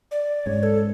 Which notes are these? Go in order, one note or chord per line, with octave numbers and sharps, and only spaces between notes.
D5
G#2 G#3 C#4 C#5
A4